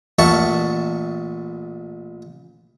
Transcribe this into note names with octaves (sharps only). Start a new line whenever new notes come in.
A1 A#2 F#4 E5 A5 C#6